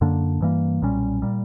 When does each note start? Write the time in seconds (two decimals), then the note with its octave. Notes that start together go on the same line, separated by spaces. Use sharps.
0.01 F#2 D3 A#3 D4
0.41 G2 E3 G3 A#3
0.82 B1 A#2 G3 C#4
1.22 A#2 G3